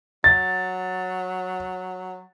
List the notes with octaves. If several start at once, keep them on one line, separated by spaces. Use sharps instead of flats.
F#3 A6